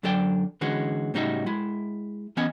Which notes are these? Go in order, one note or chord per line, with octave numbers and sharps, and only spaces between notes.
F#2 D3 F#3 A4 D5 G5
D3 E3 G#3 C#4 F#4
A2 C#3 G3 D#4 F#4 E5
G#3 E4
E3 B3 C#4 D#5 G#5